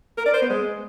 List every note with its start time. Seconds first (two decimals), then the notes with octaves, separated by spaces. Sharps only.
0.18 A#4
0.26 D5
0.34 C5
0.42 B3
0.50 G#3